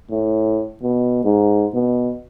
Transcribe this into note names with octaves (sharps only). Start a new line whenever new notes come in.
A2
B2
G#2
B2